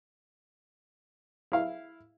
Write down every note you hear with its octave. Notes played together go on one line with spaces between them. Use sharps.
E4 F5